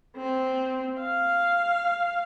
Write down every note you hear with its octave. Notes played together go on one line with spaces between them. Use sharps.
C4
F5